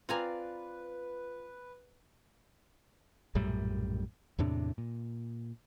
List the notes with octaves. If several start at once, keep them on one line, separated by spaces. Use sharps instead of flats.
C4 F4 B4 D5 F5 G#5 A#5
A#1 F#2 A2 G3
E2 A2 C3 D4
A#2